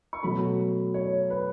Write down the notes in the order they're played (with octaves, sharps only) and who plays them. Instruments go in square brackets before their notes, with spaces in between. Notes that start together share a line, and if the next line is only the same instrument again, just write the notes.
[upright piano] C#6
B2 F#3 A3 B5
C#5
B4